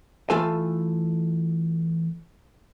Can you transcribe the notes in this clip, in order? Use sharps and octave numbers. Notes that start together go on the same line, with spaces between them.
E3 A3 F4 A4 G#5